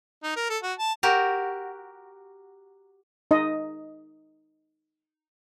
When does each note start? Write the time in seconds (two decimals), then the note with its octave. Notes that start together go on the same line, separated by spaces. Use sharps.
0.23 D#4
0.36 A#4
0.50 A4
0.63 F#4
0.79 A5
1.03 F#4 G4 A#4
3.31 D#4 D#5